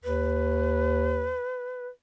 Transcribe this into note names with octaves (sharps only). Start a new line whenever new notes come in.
D#2 B4